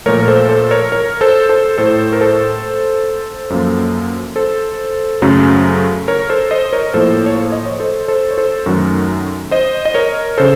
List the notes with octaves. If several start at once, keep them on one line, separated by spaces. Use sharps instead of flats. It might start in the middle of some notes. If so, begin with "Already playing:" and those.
A#2 F3 A3 A#4 C#5
A#4
A4 C5
A4 C5
A#4 C#5
A#4 C#5
A4 C5
A4 C5
A2 A3 A4 C5
A#4
A4 C5
F#2 F3 A#3
A4 C5
F#2 C#3 F#3 A3
A#4 C#5
A4 C5
C5 D#5
C5
A#4 C#5
A2 F3 A#3 A4 C5
C#5
A4 C5
D#5
C#5
A4 C5
A4 C5
C#5
A4 C5
F#2 D#3 F#3 A3 F#4 A#4
C5 D#5
D#5
A#4 C#5
C#3 A4 C5